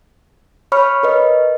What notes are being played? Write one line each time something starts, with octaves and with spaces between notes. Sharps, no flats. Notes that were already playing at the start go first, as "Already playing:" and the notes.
C#5 B5 C#6 F6
A#4 B4 D#5